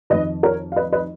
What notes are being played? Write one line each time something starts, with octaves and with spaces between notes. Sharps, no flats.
F2 D#3 B4 D#5
A#4 C#5
F5
B4 D#5
B4 D#5